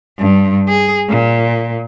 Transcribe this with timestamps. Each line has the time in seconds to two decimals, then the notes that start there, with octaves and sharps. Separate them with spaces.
0.19 G2
0.68 G#4
1.09 A#2